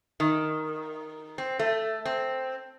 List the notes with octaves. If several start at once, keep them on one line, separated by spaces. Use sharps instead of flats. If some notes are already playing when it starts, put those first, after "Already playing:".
D#3
C4
A3
C4